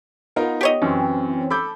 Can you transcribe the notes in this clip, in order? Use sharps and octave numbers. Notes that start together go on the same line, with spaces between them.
B3 D#4 F4 A#4
G4 C#5 D#5
F#2 E3 C4 C#4
A4 B5 D6 G6